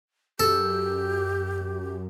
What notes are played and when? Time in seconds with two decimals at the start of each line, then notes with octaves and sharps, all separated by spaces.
0.40 F#2 G4 A4